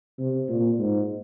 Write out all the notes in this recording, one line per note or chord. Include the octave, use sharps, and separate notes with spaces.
C3
A#2
G#2